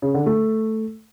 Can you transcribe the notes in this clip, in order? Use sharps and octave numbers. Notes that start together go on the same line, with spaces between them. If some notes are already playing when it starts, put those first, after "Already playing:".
C#3
D3
A3